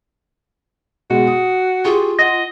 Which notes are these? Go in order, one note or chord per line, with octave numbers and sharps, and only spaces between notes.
B2 G#3 F#4
D#6
F4 G4 G#4 C#6
D#5 F#5 A#6